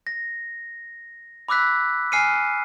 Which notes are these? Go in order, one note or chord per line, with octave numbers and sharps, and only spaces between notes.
A#6
B5 D6 E6 F#6 B6
G#5 F6 C7 C#7 D#7